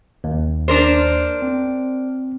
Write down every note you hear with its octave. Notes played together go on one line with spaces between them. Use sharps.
D#2
D4 A#4 C5
C4